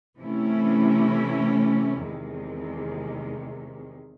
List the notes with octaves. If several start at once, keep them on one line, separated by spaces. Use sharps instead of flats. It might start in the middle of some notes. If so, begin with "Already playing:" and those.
C3 E3 A3 C#4 E4
E2 C3 D#3 G#3